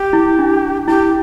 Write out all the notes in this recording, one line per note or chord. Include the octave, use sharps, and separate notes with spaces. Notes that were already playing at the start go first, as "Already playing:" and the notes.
Already playing: G4
E4
D4
E4 G4